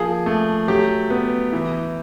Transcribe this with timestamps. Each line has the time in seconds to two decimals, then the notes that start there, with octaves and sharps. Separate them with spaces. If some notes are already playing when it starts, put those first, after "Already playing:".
Already playing: F3 A#3 G#4
0.26 A3
0.68 F#3 G4
1.10 B3
1.52 E3